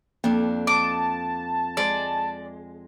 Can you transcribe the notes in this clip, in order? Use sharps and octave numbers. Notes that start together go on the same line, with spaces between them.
F2 A#3 D4
D#5 A5 D6
G#3 D5